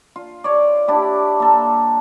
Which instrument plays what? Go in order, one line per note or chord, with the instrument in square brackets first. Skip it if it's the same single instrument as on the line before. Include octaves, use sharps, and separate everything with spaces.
[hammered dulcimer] F4
C#5 D5
D4 E4 G4
A#3 A4